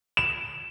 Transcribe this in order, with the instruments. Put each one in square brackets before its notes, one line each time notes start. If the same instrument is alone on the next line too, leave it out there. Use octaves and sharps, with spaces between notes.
[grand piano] E7